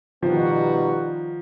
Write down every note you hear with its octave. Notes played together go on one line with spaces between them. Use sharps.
B2 D#3 F3 G3 B3 D#4 F#4